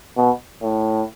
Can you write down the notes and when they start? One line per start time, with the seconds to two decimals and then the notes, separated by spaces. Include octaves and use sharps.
0.17 B2
0.62 A2